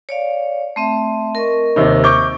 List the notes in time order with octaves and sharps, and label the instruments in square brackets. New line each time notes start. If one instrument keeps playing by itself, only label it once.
[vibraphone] C#5 D5 F5
A3 C4 E5
A#4 D#5 C#6
[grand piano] D#2 C3 D#4
C#6 D6 G6